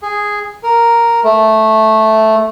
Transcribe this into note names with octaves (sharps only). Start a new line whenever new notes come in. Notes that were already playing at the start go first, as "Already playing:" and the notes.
G#4
A#4
A3